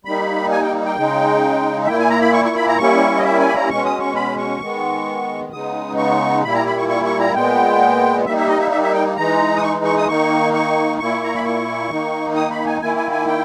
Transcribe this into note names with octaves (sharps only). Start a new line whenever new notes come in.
G3 A#3 D#4 B5
G#5
G5
G5
C#3 G#3 D#4
E5
A#2 A#3 E4 G5
G#5
A#5
B5
C#6
C#6
B5
A#5
G3 A#3 C#4 E4 C#6
D#5
E5
G#5
B5
A#5
B2 G#3 C#4 C#6
D#6
C#6
B5
C#6
D#3 G#3 B3
C#3 G#3 B3 D#4 D#6
C#6
A#2 G3 A#3 E4 B5
A#5
B5
C#6
C#6
C#6
A#5
A#2 G#3 B3 G5
G3 A#3 D#4 E5
E5
D#5
E5
E5
E5
G5
E3 G#3 D#4 A#5
D#6
C#6
C#6
D#6
D#3 A#3 D#4 C#6
C#6
A#2 A#3 E4 C#6
A#5
B5
C#6
D#3 A#3 D#4
D#6
B5
G#5
D#3 A#3 E4 G#5
G#5
G#5
G5